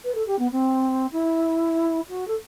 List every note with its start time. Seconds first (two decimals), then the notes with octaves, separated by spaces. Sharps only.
0.04 B4
0.15 A4
0.27 G4
0.39 B3
0.52 C4
1.12 E4
2.09 F#4
2.27 A4